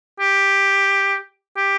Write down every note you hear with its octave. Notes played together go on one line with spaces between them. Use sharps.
G4
G4